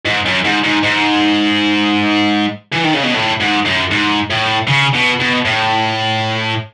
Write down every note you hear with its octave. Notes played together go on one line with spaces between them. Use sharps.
G#2
F#2
G#2
G#2
G#2
E3
D#3
C#3
B2
A2
G#2
F#2
G#2
A2
C#3
B2
B2
A2